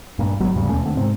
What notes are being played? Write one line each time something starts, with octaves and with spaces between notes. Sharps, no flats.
G2 A#2
G1 F#3 B3
D#2 G#2 C#3 G3
D#2 B2 A3 C#4
D3 C4
G#2 C3 C4